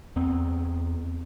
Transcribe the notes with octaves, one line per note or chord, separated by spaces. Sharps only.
E2 B3 C4